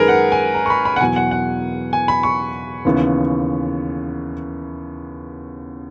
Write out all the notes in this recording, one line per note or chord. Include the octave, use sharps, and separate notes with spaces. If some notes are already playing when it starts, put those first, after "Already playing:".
Already playing: F#2 D#3 G#3 G#4 A#4 B4
F#5
G#5
A#5
C#6
B5
B5
F#5
E2 B2 F#3 B3 G#5
F#5
F#5
G#5
B5
C#6
D#2 C#3 E3 B3